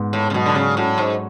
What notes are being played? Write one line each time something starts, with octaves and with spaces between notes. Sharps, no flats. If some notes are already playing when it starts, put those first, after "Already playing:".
Already playing: G#2 B3
A2
C#3
B2 F#3
D3
C#3
A2 F#4
G#2